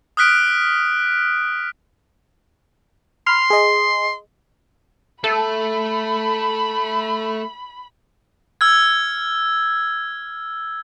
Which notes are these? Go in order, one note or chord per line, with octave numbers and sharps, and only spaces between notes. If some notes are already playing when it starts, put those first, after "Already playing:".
D#6 F6 F#6 B6 D7
B5 C6 F6
G#4 D#5
A3 A4 B5
E6 F6 G#6